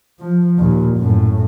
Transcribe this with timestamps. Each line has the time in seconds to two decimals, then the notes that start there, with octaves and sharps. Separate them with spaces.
0.20 F3
0.58 D#2 A#2
0.97 F#2 A2